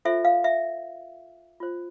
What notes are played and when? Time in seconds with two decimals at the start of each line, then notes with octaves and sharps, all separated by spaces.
0.05 F4 A4 C5 E5
0.25 F5
0.44 E5
1.60 F4 C5